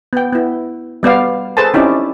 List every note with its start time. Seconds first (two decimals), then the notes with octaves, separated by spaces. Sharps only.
0.13 B3 G5
0.33 B3 E4
1.03 G3 B3 D5 F5
1.57 G#4 A4 B4 C5 G#5 A5
1.74 C4 C#4 D#4 E4 G4 D5